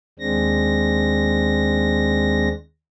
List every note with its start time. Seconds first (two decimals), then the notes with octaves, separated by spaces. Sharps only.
0.19 D#2 G#3 C4 D4 A#6